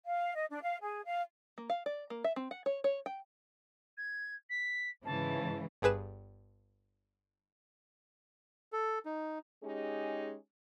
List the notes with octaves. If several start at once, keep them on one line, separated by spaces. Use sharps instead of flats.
F5
D#5
D4
F5
G#4
F5
A#3
F5
D5
A#3
E5
C4
F#5
C#5
C#5
G5
G#6
B6
G#2 C#3 E3 A5
G1 G2 G#4 B4 E7
A4
D#4
G#3 C#4 D#4 G4 G#4